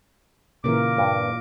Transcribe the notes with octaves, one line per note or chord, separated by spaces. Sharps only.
A#2 C#3 E3 A#3 A#4 D6
G2